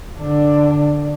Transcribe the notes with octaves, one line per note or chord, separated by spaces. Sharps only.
D3 D4